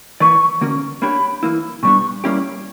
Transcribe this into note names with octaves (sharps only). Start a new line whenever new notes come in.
E3 A#3 E4 B4 D5 C#6
D3 A#3 C#4 F#4 A#4
A#3 D4 G4 C#5 B5
E3 A#3 E4
A#2 G3 B3 D4 C#6
G3 A#3 C#4 E4 G4